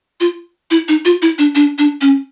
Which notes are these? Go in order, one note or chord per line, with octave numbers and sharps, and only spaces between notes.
F4
E4
D#4
F4
E4
D4
D4
D4
C#4